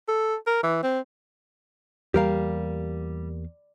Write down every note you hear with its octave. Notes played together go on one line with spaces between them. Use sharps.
A4
A#4
E3
C4
E2 E3 G3 A#3 G4 A#4 F5